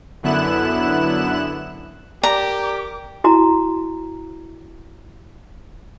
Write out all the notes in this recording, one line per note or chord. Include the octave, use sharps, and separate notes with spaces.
F#2 D3 B3 E4 F#6 E7
G4 A#4 D5 A#5 D6
E4 F#4 A#5